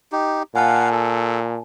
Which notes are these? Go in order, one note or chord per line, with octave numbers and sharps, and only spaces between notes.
D#4 G4
A#2 F5 F#5 G#5 A5
A4